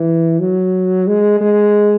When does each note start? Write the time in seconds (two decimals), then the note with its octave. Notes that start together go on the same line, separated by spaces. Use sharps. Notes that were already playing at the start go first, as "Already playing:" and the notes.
Already playing: E3
0.40 F#3
1.07 G#3
1.41 G#3